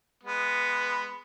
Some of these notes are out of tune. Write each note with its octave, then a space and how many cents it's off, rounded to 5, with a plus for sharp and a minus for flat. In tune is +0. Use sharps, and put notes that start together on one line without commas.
G#3 -10 B3 +0